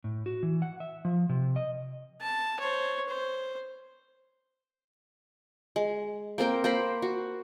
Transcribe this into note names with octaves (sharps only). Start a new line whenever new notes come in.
A2
F#4
E3
F#5
E5
F3
C3
D#5
A5
C5 C#5
C5
G#3
A#3 C4 A#4 G5
A#3 C5 A#5 B5
F#4